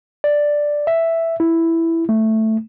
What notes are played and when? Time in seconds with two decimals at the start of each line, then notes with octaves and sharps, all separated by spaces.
0.24 D5
0.87 E5
1.40 E4
2.09 A3